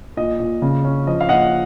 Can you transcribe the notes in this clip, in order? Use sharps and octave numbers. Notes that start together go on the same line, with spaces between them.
A#2 D#5
A#2
C#3
C#4
F3 D#5
F5
A#2 D#5 F#5